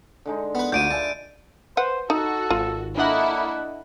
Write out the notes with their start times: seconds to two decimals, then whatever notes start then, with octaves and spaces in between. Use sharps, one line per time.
0.26 D3 G#3 D#4
0.55 B3 B4
0.72 D2 D3 F4 D5 G6 D7 D#7
0.91 B4 E5 G#5 A5
1.77 B4 C5 F#5
2.10 D#4 F#4 A4
2.50 G#1 F4
2.97 A#3 D4 E4 A4 D#5 F#5